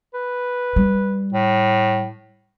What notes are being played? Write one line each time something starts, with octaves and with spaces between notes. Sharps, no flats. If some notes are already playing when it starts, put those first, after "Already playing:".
B4
G3
A2